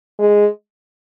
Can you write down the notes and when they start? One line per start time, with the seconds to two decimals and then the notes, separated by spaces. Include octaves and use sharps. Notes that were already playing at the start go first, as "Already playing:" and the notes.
0.19 G#3